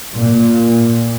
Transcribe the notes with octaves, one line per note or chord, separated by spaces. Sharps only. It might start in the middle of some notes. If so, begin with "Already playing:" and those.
A#2